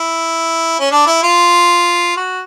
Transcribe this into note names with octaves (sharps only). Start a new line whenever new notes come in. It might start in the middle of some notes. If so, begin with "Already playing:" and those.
Already playing: E4
C#4
D4
E4
F4
F#4